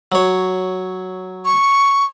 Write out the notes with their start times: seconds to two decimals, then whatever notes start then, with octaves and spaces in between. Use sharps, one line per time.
0.12 F#3 C#5
1.45 C#6